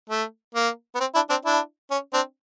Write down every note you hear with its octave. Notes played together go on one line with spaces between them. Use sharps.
A3
A#3
B3
C4
D4 E4
C4 D4
D4 E4
C#4
C4 D4